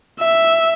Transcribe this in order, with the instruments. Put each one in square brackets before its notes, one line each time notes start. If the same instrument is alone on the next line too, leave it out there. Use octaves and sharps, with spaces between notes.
[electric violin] E5